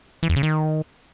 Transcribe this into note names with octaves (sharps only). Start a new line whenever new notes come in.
E3
E2
C#3
D#3